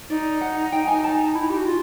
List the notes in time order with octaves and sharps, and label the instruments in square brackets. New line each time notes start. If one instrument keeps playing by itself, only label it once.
[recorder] D#4 [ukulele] D5
[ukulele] F#5
G5
G#5
A5
[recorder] E4
G4
F#4
F4